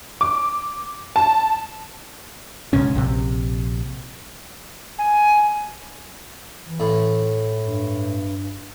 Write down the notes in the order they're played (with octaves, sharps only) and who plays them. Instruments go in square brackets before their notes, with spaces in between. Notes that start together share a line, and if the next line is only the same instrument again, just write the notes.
[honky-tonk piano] D6
A5
[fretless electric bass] B1 G#2 C#3 C#4
A#1 C3
[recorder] G#5
[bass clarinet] E3
[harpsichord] A2
[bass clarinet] G2